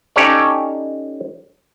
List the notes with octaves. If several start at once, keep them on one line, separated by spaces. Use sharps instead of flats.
C#4 D#4 G4 A4 C#5 D5